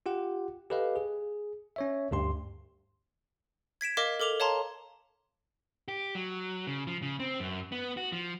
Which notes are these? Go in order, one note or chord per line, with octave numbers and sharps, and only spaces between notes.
F4 G4 F#5
G4 A4 B4 D#5 F5
G#4
C#4 C#5 E5
D2 G2 G4 C6
G#6 B6 D7 E7
A#4 D#5 F5 D6 B6 E7
A4 A#4 D6 F7 F#7
C#5 F5 A5 A#5 C6
G4
F#3
C#3
F3
C#3
C4
F#2
B3
F#4
F3